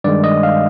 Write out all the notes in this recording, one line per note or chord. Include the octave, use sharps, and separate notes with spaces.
G2 D#3 G#3 D5
D#5
F5